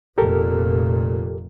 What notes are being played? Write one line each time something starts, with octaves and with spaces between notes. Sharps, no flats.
F1 A#2 G4 A4 A#4